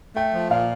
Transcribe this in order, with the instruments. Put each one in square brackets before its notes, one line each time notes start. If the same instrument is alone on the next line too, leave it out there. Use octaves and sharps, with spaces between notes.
[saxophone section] A3 [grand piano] G5
[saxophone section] F3
[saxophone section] A#2 [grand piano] F5